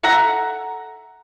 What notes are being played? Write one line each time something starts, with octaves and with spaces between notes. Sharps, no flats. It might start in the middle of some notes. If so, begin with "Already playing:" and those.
A4 E5 F#5 A#5